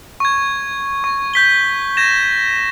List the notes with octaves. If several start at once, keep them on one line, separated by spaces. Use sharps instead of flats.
C#6 G#6
C#6
G6 B6 G7
G#6 A#6 E7